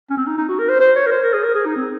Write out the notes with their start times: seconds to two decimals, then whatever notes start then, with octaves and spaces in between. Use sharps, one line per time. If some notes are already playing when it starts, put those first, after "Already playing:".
0.10 C#4
0.17 C4
0.27 D#4
0.38 D#4
0.49 F#4
0.59 A#4
0.69 C5
0.80 C5
0.96 C#5
1.06 A#4
1.12 C5
1.23 A#4
1.34 G#4
1.44 A#4
1.55 G#4
1.65 D#4
1.76 C4